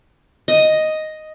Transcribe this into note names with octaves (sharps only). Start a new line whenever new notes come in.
D#5